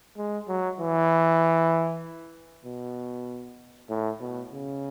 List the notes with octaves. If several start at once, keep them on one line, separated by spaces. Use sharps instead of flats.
G#3
F#3
E3
B2
A2
B2
C#3